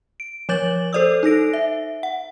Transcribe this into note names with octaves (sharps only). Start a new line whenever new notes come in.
D7
F3 C#5 D6 G6 A6 F#7
A4 C5 D5 D#6 E6
D#4 A4 A#6 D7
E5
F#5